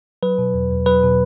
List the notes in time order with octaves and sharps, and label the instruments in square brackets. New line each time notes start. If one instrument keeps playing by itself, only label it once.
[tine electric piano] F#3 B4
B2
E2
E2
F#3 B4
B2